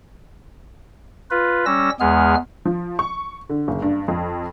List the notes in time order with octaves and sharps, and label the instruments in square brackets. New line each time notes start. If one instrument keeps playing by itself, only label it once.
[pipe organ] F4 B4
G3 C#4 E6 A#6
E2 G#3 B3 G#4 F6
[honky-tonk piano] F3
C#6
D3
F#1
G2
F2